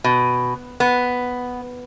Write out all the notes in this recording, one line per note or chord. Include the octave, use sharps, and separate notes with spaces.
B2
B3